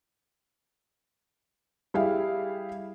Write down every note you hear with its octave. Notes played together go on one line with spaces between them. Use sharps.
G3 E4 G#4 E5 F5